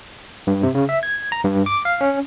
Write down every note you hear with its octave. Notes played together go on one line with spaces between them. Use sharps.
G2
C3
C#3
E5
G#6
A#5
G2
D6
F5
C#4